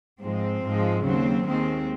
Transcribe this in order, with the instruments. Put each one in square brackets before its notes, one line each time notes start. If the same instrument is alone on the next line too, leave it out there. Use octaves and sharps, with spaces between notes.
[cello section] G#2 F3 G#3 C4
G#2 F3 G#3
D#2 C#3 F#3 C4
D#2 D#3 G#3 C4